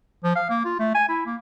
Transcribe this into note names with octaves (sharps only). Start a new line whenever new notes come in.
F3
F5
A#3
F4
A3
G#5
E4
A#3